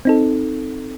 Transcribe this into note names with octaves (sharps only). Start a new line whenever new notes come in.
C4 D#4 A4